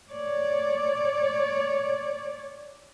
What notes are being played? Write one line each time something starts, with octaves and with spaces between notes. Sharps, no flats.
C#5 D5